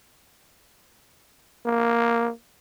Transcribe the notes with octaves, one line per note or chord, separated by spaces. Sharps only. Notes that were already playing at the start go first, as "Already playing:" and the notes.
A#3